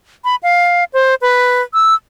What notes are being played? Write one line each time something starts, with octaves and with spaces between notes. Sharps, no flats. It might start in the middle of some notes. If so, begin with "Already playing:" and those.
B5
F5
C5
B4
E6